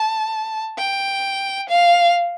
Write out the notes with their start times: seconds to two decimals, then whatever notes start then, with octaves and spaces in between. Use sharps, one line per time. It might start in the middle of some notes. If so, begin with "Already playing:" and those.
Already playing: A5
0.78 G5
1.70 F5